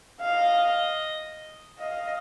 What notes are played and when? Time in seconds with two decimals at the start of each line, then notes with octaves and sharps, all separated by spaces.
0.21 D#5 F5
1.79 D#5 F5